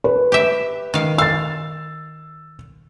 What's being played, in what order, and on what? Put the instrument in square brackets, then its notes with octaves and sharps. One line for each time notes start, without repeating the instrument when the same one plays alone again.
[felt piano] B4
[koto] G4 E5
D#3 F5
[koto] F5 [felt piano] E6 A6